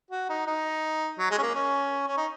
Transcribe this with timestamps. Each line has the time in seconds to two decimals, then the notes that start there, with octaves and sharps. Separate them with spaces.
0.11 F#4
0.29 D#4
0.47 D#4
1.18 F#3
1.31 G#3
1.38 C#4
1.43 A#3
1.55 C#4
2.07 C#4
2.17 D#4